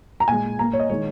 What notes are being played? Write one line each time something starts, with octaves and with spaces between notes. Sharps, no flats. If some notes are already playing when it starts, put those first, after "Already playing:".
A#5
A#2 G#3 G#5
A#2 A#3 A#5
C#5
D#5
D#3 G#3 C#5